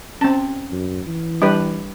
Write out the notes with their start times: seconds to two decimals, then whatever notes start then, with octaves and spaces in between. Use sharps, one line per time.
0.21 C4 C#4 A5
0.72 F#2
1.07 E3
1.42 G3 D4 G4 B4